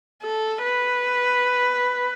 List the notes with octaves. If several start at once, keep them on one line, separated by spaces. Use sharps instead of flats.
A4
B4